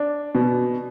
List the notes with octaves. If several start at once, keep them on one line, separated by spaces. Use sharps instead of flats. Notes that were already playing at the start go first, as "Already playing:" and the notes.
Already playing: D4
B2